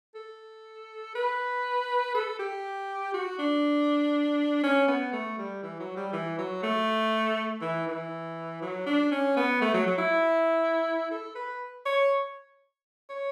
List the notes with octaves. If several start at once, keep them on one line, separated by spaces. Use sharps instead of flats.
A4
B4
A4
G4
F#4
D4
C#4
B3
A3
G3
E3
F#3
G3
E3
F#3
A3
E3
E3
F#3
D4
C#4
B3
A3
F#3
F#3
E4
A4
B4
C#5
C#5